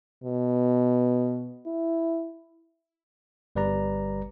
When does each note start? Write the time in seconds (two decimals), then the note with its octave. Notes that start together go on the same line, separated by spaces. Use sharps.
0.24 B2
1.66 E4
3.56 G1 G3 B4 D5 A#5